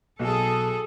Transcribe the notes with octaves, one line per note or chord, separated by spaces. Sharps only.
B1 G#4 A4